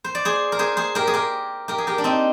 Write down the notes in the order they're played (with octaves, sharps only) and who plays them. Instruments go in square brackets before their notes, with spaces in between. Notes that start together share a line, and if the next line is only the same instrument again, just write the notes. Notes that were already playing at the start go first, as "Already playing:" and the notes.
[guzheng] C5
D5
G#4 C5
A#4
G#4 C5
G#4 C5
G4 A#4
G#4
G4 A#4
G4 A#4
G#4
G4 A#4
D4
C4 D#4